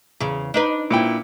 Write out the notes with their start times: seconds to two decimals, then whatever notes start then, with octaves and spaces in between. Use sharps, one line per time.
0.20 E2 C#3
0.54 D4 D#4 B4
0.91 A#2 E4 G5